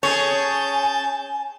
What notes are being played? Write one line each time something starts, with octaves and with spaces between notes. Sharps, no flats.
C#4 G#4 C#5 G#5 A5 G6